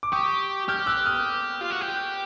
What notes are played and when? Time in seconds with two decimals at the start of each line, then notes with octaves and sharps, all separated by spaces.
0.03 D6
0.12 G4 C#6 D#6
0.68 G4 F6 G6
0.86 E6 F#6
1.06 D#6 F6
1.61 F4
1.71 F#4
1.81 G4